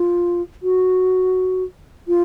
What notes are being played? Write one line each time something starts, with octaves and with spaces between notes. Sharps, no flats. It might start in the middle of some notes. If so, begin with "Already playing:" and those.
Already playing: F4
F#4
F4